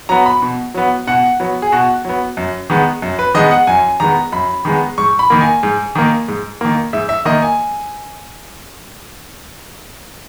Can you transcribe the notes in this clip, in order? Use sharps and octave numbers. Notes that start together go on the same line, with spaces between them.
F#3 B3 A#5
B5
B2
F#3 B3
B2 F#5
F#3 B3
G#4
B2 F#4
F#3 B3
F#2
D#3 G#3 B3
F#2
B4
D#3 G#3 B3 D#5
F#5
F#2 G#5
D#3 G#3 B3 A#5
F#2 B5
D#3 G#3 B3
G#2 C#6
B5
D#3 A#3
G#5
G#2
D#3 A#3
G#2
D#3 A#3
G#2 E5
E5
D#3 A#3 D#5
G#5